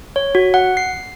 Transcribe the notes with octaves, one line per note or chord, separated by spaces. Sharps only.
C#5
F#4
F#5
C7